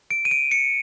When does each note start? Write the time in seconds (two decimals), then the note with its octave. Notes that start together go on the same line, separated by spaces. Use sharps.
0.11 D7
0.25 D#7
0.31 D7
0.51 C#7